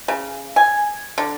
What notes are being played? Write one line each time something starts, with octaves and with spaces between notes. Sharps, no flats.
C#3
G#5
D3